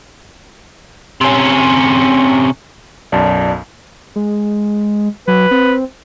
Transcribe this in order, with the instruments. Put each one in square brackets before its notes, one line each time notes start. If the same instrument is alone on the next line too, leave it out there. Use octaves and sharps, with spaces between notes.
[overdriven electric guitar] C3 C#4
[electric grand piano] B1 F#2 [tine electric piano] D5 A5
[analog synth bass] G#3
[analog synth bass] F#3 [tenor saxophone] B4
[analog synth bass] C4